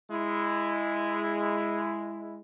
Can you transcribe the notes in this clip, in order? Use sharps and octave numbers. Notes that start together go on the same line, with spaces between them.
G#3 E4